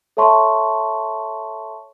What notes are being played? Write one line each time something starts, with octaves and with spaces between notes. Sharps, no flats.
A4 C#5 E5 A5 C6 C#6